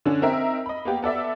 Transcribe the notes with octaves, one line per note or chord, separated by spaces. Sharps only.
D3 C#4 D4
C4 D#4 A#4 E5
D#5 B5
A#3 B3 G4
B3 A4 D5 E5